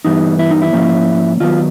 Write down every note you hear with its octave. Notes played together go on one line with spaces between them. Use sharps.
G2 E3 G3 B3 D#4
E4
D#4
E4
G#2 F3 A#3 C#4
D#2 D#3 F#3 B3 F4